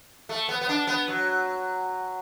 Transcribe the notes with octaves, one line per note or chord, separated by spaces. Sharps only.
A3
B3
B3
D4
B3
F#3